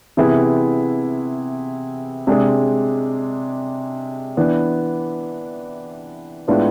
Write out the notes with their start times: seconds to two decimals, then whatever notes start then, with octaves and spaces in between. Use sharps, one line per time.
0.17 C3 E3 B3 E4 G#4
2.27 C3 G#3 D4 G#4
4.37 E3 B3 D4
6.48 A2 G#3 B3 D4 F4